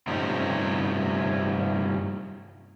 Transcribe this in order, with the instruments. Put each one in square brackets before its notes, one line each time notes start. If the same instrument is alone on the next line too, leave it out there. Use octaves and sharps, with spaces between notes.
[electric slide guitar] G2 C3 F3 A3 C#4 D#4